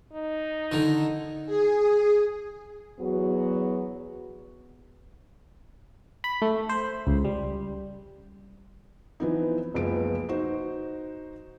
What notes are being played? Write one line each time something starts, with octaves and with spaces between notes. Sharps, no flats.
D#4
D3 D#3
G#4
E2 F#3 B3 F#4 G#4
B5
A3
C5
C#2
G3
E3 F3 B3 C4 D#4
F#1 C#2 F3 B3 D7
D#4 F#4 C5